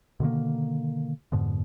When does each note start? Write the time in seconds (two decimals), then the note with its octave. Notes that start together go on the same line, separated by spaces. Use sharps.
0.20 B2 D3 D#3 A#3
1.32 F2 G#2 B2 D3